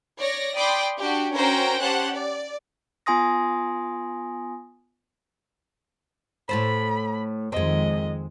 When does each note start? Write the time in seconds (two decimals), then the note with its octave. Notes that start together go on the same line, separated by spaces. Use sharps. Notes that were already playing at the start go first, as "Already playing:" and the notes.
0.20 C#5 D5 A#6
0.56 D5 G5 B5 C6 D6 D#6
0.98 D4 F#4 G4
1.36 C#4 F#4 A#4 C5 G5 A#5
1.81 C#4 G4 C5 F#5 A5 F#6
2.15 D5
3.06 B3 F4 G#5 C6 D#6 A#6
6.49 A2 A4 C5 B5
7.52 F2 D#3 G#3 C4 D#5